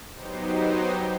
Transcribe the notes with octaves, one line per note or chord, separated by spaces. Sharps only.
F#3 B3 D#4 G4 C5